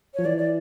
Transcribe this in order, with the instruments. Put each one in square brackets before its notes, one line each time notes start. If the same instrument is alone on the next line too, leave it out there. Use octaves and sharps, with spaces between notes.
[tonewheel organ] F3 [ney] C#5
[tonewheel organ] E3 [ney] D5
[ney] D5